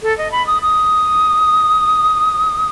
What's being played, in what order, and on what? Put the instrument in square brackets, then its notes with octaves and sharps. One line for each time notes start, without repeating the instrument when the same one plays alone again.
[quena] A4
D#5
B5
D#6
D#6